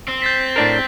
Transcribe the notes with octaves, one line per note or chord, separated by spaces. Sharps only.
C4
G6 A6 B6
B6
A2 D4 A#4